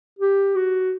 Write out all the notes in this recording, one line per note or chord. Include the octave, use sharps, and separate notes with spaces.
G4
F#4